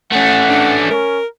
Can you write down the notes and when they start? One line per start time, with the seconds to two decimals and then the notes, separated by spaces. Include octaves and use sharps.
0.12 A3 C#4 F#5
0.50 D4
0.91 C#4 A#4